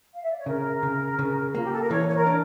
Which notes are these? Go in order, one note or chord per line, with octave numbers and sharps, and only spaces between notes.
F5
E5
D5
C#5
C#3 A#4
C#3
C#3
A#3 F4
G4
A4
A#4
E3 C#5
C#5
A#4
D4